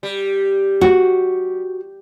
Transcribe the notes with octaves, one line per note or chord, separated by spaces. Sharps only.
G3
F#4